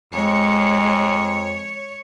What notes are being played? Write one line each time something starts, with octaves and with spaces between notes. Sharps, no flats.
F2 G#3 C#5